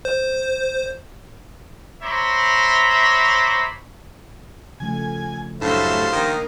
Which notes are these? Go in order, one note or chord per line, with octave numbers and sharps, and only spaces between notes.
C5
C5 C#5 E5 A#5 B5 D6
C#3 F3 A3 G#5
F#2 A2 G3 A3 D4 C5 E5 F5
D#3 A#3 D#4 A#4